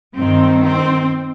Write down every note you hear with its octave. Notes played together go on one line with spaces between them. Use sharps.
G2 D#3 C4
C4